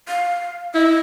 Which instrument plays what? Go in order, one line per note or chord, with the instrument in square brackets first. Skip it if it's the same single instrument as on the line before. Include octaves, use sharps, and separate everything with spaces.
[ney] F5
[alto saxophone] E4 [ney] D#5